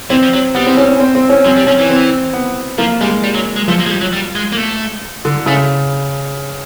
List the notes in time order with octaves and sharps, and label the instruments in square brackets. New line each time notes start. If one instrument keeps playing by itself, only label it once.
[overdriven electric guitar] E3 [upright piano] C4
[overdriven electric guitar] F3
F#3
[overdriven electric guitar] G3 [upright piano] B3
[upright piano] C4
C#4
C#4
C4
C4
C#4
[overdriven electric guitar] F#3 [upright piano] C4
[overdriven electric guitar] G3
[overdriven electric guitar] F3 [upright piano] C#4
[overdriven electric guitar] E3
[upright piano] C4
B3
[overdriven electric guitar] F3 [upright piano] A#3
[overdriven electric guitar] G3 [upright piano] G#3
[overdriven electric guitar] G3
F#3
G#3
[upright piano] F3 [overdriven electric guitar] A3
[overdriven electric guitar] A#3
G#3
G3
F#3
G3
G#3
A#3
A3
[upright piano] D3
[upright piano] C#3 [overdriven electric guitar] A3